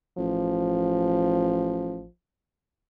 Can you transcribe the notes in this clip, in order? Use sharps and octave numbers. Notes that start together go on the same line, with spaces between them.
A1 F3